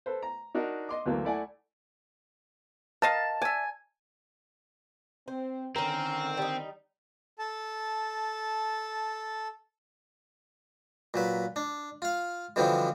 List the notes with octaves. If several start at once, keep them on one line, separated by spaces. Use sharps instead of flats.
A4 B4 C5
A#5
D4 D#4 F#4 A#4
D#5 C6 D6
D2 E3 F#3 A3 A#3
A3 E4 D5 F#5 G#5
A#4 D#5 F5 A5
D5 E5 G#5
C4 C5
D3 D#3 C4 C#4 A#4
G3 D#4
A4 A5
A#2 F#3 B4
D4
F4 F5
B2 D3 E3 F3 G3 C4